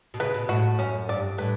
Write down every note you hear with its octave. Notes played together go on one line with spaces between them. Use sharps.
B2
C#3 B4
B2
A2 F#4
F#2 C#4
G2 D5
A2 B4